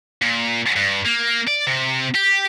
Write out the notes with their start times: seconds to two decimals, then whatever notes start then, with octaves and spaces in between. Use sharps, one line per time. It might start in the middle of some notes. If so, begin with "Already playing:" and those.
0.22 A#2
0.76 G2
1.05 A#3
1.48 D5
1.67 C3
2.15 G4